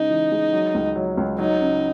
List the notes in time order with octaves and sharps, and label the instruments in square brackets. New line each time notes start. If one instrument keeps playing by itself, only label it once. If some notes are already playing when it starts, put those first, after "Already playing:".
Already playing: [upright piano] C#3 G#3 [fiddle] D#4
[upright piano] E3
G#3
F#3
C#2
F#3
C#2
[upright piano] F#3 [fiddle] D#4
[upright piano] C#3